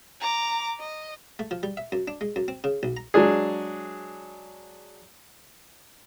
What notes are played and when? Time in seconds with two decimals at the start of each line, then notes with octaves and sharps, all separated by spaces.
0.21 A#5 D6
0.80 D#5
1.39 A3
1.51 F3
1.63 G3
1.77 E5
1.92 F#2
2.08 D4
2.21 G#3
2.36 F#2
2.48 C4
2.64 C#3
2.83 B1
2.97 A#5
3.14 F#3 G#3 D4 G#4